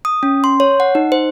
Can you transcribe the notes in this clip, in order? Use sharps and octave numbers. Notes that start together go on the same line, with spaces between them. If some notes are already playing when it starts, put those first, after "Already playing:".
D#6
C#4
C6
C#5
F#5
D#4
C5